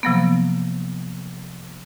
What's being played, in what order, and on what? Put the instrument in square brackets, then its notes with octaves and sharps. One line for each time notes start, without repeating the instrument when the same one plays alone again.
[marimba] C3 F3 F#3 A#3 B3